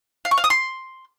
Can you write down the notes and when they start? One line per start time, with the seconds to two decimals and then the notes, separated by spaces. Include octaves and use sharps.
0.25 F5
0.31 C#6
0.38 F5
0.44 D#6
0.50 C6